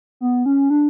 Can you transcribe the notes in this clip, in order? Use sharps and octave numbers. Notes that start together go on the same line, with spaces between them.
B3
C#4
D4